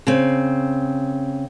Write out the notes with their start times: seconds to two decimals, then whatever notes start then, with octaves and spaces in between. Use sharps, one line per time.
0.07 C#3 C4